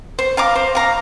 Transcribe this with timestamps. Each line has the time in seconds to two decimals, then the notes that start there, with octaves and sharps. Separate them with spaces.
0.19 C5
0.37 F5 A#5 D6
0.55 C5
0.75 F5 A#5 D6